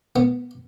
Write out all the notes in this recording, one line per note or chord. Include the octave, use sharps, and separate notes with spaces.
B3